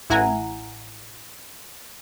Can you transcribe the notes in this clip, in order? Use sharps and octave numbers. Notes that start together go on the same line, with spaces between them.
A1 E4 F#5 G#5 A#5